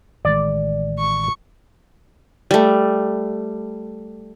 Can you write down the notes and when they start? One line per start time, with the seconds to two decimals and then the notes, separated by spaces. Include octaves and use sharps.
0.25 A1 D#3 G#3 D5
0.99 C#6
2.51 G3 A3